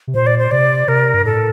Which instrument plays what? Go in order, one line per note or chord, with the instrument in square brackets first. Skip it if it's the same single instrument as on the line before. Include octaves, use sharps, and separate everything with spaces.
[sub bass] C3
[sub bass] A#2 [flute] C5
[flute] D5
C5
[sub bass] C3 [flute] D5
[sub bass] C3 [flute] A#4
[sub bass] G2
[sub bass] A2 [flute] A4